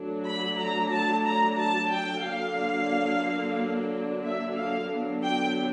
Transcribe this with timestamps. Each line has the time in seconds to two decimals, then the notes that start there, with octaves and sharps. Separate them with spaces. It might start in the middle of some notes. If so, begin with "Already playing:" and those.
Already playing: F#3 A3 D4
0.26 B5
0.59 A#5
0.92 A5
1.25 A#5
1.58 A5
1.91 G5
2.24 D3 F#3 A#3 D4 F5
4.24 E5
4.56 F5
4.91 D3 F#3 B3 D4
5.23 G5